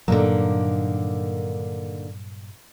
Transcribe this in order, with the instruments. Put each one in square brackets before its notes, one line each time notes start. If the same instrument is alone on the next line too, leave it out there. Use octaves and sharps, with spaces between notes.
[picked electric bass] G2 A#2 F#3 [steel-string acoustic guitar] D3 D#3 A#3